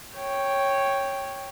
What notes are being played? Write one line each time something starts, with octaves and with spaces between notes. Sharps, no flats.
C#5 G5